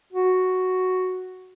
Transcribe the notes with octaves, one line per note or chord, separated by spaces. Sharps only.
F#4